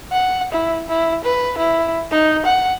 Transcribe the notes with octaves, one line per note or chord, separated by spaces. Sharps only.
F#5
E4
E4
B4
E4
D#4
F#5